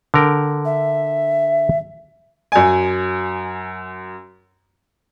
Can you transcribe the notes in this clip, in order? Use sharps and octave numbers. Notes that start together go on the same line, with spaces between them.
D3 A#4 G5
E5
F#2 G#5